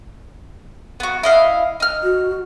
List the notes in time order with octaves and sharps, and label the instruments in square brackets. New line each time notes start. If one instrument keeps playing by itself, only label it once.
[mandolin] B3 F#4
E4 D#5 F5
D#4 F6
[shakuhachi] F#4